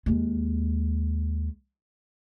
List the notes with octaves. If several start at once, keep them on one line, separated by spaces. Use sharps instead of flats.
D#2 G#3